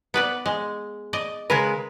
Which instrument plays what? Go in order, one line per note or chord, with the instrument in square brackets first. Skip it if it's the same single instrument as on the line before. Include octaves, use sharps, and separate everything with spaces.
[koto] B3 B4 D5
G#3
D5 D#5
[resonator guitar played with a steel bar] C#3 G#3 B4 [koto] A#4